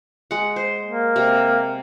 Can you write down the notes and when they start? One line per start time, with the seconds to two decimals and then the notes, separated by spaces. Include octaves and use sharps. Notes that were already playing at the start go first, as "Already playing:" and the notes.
0.31 G#3 F#5
0.56 C5
0.85 A#3
1.16 C3